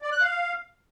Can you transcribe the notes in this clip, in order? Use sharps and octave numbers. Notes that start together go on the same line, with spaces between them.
D5
F#6
F5